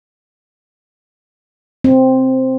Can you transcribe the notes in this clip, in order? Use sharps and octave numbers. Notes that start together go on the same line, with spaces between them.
C4